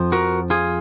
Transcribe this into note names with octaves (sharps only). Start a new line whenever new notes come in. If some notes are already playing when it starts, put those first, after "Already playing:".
Already playing: F2 F3
F#4 A#4
F4 G#4